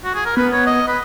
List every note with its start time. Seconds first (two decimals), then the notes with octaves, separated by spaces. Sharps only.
0.05 F#4
0.15 G#4
0.26 A#4
0.37 B3 B4
0.52 C#5
0.67 D#5
0.88 B4